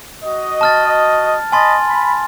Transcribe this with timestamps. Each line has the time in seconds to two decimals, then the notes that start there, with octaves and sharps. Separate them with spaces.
0.24 F#4 D#5
0.61 A5 F6 A6
1.52 D#5 G#5 A5 B5 C6 A6
1.88 B5